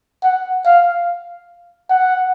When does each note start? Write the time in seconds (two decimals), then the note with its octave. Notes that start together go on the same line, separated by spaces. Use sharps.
0.24 F#5
0.65 F5
1.90 F#5